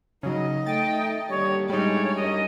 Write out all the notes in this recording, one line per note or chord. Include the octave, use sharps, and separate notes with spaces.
C#3 F#3 D#4 D#5
A3 G5 A6
D#2 D3 G3 C#5
A2 G3 G#3 D4 D#4 C#5 D5
F#2 C#4 D#5